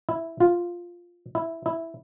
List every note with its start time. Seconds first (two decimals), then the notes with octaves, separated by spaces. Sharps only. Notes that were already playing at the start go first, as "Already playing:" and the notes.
0.09 E4
0.40 F4
1.35 E4
1.66 E4